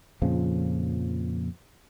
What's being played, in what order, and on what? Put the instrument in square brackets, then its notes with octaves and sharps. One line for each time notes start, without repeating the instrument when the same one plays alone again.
[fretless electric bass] F2 A#2 C#3 F3